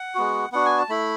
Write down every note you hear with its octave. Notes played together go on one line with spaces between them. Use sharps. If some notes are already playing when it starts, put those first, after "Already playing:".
Already playing: F#5
G#3 B3 F#4
B3 D4 F#4 F#5
G#5
A5
A3 E4 B5